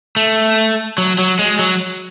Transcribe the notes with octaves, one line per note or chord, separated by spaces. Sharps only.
A3
F#3
F#3
G#3
F#3